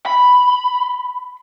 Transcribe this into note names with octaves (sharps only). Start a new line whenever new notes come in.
B5